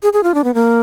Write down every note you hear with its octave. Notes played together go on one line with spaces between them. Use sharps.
G#4
G#4
F4
D4
B3
A#3